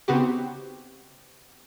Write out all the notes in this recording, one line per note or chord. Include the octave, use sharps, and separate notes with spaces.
C#3 B3 C4 D#4 F#4 G4